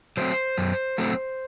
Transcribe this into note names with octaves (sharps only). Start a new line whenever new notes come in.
F#3 A3 C4 C5
F#2
F#3 A3 C4